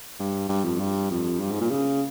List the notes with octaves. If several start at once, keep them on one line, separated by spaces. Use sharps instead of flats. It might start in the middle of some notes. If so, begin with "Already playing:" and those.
G2
G2
F2
G2
F2
G2
G#2
A#2
C#3